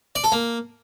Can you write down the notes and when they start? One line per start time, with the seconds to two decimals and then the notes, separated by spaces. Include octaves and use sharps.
0.15 D5
0.24 A4
0.32 A#3